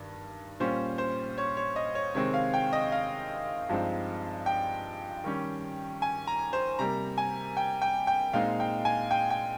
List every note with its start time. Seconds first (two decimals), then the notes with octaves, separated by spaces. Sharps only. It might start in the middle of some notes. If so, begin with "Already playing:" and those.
Already playing: G2 D#3
0.60 A#2 G3 C#4 F4 C5
0.98 C5
1.38 C#5
1.57 C#5
1.76 D#5
1.95 C#5
2.15 C3 D#3 G#3 C4 C#5
2.34 F5
2.54 G5
2.73 D#5
2.92 F5
3.69 G2 F3 G#3 C4 D#4
4.46 G5
5.24 D#3 G3 C#4
6.02 G#5
6.27 A#5
6.53 C5
6.79 C3 G3 A#3 A#5
7.18 G#5
7.57 G5
7.82 G5
8.07 G5
8.33 A#2 G#3 C4 D#4 F5
8.60 G5
8.85 G#5
9.11 G5
9.30 G5